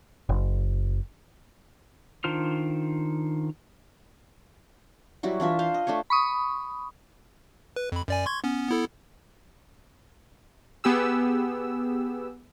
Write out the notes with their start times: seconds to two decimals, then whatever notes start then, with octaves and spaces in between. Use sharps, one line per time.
0.29 F#1
2.24 D#3 D4 F4 C5 F6
5.23 F#3 G3 E4 F#4
5.40 E3 D4 F4 E5
5.59 C5 F5
5.74 D#5
5.87 A3 D4 C5 C#5
6.10 B5 C#6 D#6
7.76 B4
7.92 F2 B5
8.08 F#2 D5 G#5
8.26 C6 C#6 G#6
8.44 B3 C#4
8.69 B3 E4 A4
10.84 B3 G4 G#4 E6